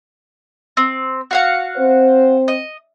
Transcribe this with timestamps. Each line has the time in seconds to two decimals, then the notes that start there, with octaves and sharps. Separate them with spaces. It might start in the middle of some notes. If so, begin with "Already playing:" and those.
0.77 C4
1.31 F#4 F5 F#5
1.77 C4 C5
2.48 D#5